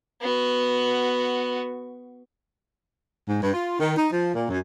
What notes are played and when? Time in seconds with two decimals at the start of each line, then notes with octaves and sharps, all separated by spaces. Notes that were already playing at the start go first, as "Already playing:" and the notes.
0.21 B3 F#4
3.28 G#2
3.42 G2
3.54 F4
3.79 D#3
3.96 D#4
4.11 F3
4.34 A#2
4.48 F#2